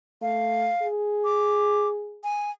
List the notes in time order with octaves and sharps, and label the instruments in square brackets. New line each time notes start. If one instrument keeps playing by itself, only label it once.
[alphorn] A3 [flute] F5
[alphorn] G#4
[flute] D6
G#5